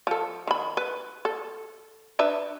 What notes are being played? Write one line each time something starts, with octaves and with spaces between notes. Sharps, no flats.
F3 A4
D#3 B5
B4
A4
D4 B4 E5